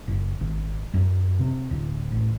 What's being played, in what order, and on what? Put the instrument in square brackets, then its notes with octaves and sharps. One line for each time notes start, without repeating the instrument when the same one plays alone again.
[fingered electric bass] F#1
G#1
F#2
C3
D1
A1